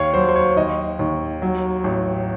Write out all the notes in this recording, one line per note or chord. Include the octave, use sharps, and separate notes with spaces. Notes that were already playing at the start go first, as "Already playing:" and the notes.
Already playing: D#2 C#5 F5
F#3 C5
C5
C#5
D#2 D#5
D#2
F#3
A1